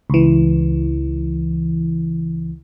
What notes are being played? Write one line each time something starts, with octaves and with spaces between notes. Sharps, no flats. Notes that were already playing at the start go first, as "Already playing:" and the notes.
C#2 E3